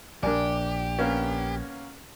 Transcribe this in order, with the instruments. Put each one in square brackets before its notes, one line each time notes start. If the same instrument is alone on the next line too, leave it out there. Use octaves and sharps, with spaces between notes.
[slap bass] A#1 [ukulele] D4 A#4 D5 [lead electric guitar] G4 [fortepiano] G#5
[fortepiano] A#3 B3 C#4